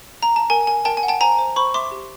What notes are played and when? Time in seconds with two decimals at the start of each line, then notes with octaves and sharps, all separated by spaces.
0.23 A#5
0.36 A5
0.50 A#4 G#5
0.67 A#4 G#5
0.85 A#4 G5 A5
0.97 G#5
1.03 F#5
1.08 G5 A5
1.21 C5 G#5 A#5
1.38 C5
1.56 C5 B5 C#6
1.74 E5 C6 D6
1.91 G4